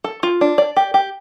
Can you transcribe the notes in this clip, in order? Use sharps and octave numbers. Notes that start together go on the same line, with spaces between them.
A4
F4
D4
D5
G4
G4